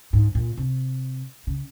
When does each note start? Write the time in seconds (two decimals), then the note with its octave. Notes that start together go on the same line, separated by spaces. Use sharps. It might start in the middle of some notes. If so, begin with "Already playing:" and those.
0.13 G#2
0.35 A#2
0.57 C3
1.47 C#3